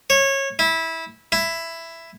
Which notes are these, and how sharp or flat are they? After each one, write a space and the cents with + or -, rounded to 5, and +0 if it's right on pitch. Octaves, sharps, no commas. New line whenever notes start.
C#5 -20
E4 -20
E4 +5